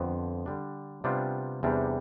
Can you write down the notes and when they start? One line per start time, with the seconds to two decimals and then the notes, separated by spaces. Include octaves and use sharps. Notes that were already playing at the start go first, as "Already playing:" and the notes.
Already playing: F2 D3 F3 B3
0.46 D3 G3 D4
1.04 C3 G3 B3 D4 F4
1.63 E2 C3 G3 D4